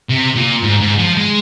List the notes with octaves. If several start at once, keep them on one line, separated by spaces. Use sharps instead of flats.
C3
A#2
G#2
G#2
F3
G#3